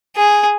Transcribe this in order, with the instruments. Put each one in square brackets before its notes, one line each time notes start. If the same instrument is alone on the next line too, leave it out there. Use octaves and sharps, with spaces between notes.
[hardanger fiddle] G#4